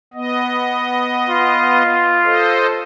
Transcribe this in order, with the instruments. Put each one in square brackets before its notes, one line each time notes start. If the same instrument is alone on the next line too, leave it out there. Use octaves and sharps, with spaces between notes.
[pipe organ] B3 D#5
[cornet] F4
[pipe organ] A4 C5 D#5